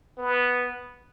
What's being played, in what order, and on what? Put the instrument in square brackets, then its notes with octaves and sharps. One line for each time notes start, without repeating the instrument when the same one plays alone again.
[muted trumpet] B3